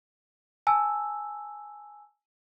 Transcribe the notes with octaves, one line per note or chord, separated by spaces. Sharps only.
G#5 A5 E6